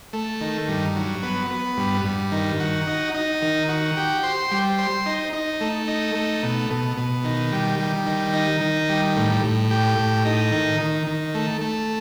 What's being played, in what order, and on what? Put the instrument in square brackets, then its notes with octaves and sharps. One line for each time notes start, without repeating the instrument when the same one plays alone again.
[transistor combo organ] A3
D#3
G2
F#3
B3
B3
G2
G2
D#3
F#4
D#4
D#4
D#3
F#4
G4
C5
G3
C5
D#4
D#4
A3
D#4
A3
B2
B2
B2
D#3
G3
G3
D#3
D#4
D#3
G3
A2
A2
G4
A2
D#4
D#3
D#3
D#3
A3
A3